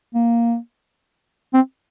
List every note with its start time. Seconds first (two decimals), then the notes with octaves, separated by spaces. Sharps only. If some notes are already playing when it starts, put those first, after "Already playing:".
0.14 A#3
1.54 C4